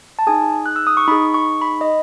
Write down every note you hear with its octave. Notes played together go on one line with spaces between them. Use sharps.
A5
D#4 G#4 G#5
F#6
E6
D#6
C#6
D#4 G#4 B5
C#6
B5
D#5